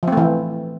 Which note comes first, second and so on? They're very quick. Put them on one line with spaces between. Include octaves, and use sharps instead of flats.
F3 C4 A3 E3